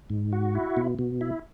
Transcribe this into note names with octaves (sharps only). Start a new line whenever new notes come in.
G#2
F#4
E4
B2
B2
E4